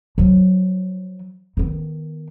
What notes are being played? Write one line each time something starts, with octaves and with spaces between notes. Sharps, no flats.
F3 F#3
D#3 B3